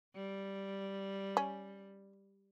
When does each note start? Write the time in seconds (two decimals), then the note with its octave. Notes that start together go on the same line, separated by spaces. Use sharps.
0.15 G3
1.37 C#4